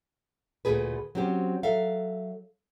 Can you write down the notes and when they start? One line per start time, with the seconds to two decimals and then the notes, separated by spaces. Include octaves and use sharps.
0.65 D2 A#2 E3 A3 G#4 B4
1.15 F#3 C4 C#4 G4 C5
1.63 F#3 A4 E5 F5